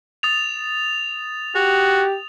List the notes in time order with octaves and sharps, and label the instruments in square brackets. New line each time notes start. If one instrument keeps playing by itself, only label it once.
[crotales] D#6 A6 F7
[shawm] F#4 [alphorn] G4